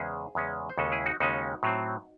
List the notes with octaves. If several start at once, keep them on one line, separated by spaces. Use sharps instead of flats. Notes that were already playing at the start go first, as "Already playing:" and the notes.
Already playing: E2 C#3 G#3 C#4 G#4 C5
E2 C#3 G#3 C#4
C5
D#2 C#3 G#3 C#4 F#4 A4
E4 G#4
D#4 F#4
D#2 C#3 G#3 C#4 D#4 F#4
A2 F#3 C4